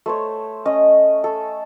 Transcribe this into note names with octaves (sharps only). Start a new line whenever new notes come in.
A3 C5 C#5
C#4 D#5
A4